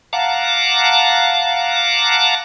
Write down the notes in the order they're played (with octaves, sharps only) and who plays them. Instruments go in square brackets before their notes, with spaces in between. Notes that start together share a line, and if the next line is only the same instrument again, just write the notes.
[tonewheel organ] F5 F#5 A5 A#5 D6